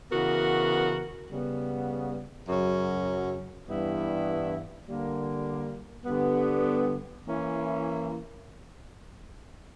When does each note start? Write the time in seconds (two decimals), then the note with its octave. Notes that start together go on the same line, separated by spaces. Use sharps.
0.10 C#3 E3 B3 F#4 A#4
1.30 C#3 G3 B3
2.48 F#2 C#3 F#3 C#4
3.68 G2 E3 G3 B3 E4
4.87 D3 G3 A#3
6.06 G2 D3 G3 B3
7.25 E3 A#3 C#4 E4